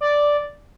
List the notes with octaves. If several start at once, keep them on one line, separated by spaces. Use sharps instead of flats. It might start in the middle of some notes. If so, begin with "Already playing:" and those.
D5